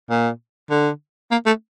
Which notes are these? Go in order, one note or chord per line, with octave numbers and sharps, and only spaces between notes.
A#2
D3
A#3
A3